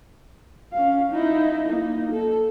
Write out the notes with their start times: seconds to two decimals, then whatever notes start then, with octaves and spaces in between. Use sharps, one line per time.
0.73 C#4 F5
1.12 D#4 E4
1.67 A#3 D#4
2.11 A4